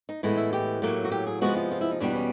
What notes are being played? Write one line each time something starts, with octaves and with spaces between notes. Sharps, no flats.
D#4
A2 E3 G#3 B3
E4
G4
A2 F#3 A#3
F#4
G4
G#4
C3 F3 G#3 B3 F#4
F4
F4
E4
D#4
E2 B2 G3 B3 D4
C#4